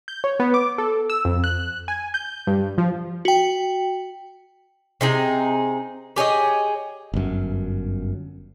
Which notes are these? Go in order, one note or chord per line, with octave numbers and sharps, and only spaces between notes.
G6
C#5
B3
D6
A4
E6
F2
F#6
G#5
G6
G2
F3
F#4 G5
C3 D#4 G#4
G4 G#4 C#5 D#5
G1 F#2